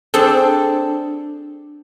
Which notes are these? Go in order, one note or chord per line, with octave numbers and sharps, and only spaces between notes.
C4 D4 G#4 A4 A5